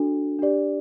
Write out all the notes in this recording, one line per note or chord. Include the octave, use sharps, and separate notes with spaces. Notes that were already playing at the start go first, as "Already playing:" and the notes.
Already playing: D4 F#4 A4
D4 G4 D5